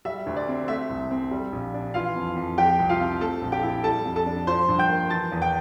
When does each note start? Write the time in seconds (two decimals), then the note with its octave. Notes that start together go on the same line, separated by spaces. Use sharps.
0.05 G3 E5
0.26 D2
0.36 D5
0.48 C4
0.68 A3 E5
0.90 C2
1.10 C4
1.31 G3
1.52 A#1
1.74 D4
1.94 E3 F4 F5
2.16 F2
2.36 F2
2.58 F3 G4 G5
2.79 C2
2.89 F4 F5
3.00 C4
3.21 A3 A4 A5
3.42 A#1
3.52 G4 G5
3.63 E4
3.84 G3 A4 A5
4.05 F2
4.16 A4 A5
4.26 D4
4.47 F3 C5 C6
4.68 G2
4.79 G5 G6
4.89 A#3
5.10 E3 A5 A6
5.32 E2
5.42 G5 G6